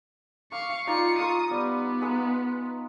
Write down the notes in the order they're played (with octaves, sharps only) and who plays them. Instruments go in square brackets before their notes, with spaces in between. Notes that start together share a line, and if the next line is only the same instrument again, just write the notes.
[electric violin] F5 C#6 [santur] D6
[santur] D#4 D5 [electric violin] F4 C#7
[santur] F4 A#4 C#6 [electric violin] D#6
[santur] G3 [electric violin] B3
[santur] G#3 D#6